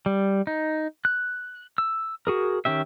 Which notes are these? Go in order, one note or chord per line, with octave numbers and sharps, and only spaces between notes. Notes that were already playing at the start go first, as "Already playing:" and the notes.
G3
D#4
F#6
E6
F#4 G#4 A#4
D#3 C#4 G4 E5